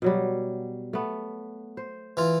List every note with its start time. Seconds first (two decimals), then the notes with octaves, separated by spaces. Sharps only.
0.02 B2 F#3 G3
0.93 A3 B3
1.77 C5
2.17 E3 F4